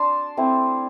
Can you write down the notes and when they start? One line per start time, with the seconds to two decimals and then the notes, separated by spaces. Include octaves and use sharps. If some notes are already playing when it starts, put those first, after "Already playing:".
Already playing: D4 D5 A5 C6
0.37 A3 C4 E4